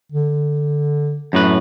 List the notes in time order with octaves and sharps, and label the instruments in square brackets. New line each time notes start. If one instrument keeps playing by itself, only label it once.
[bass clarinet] D3
[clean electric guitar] F#2 A2 B4